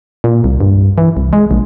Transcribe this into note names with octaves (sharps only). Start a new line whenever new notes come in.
A#2
C2
G2
E3
C2
G#3
A#1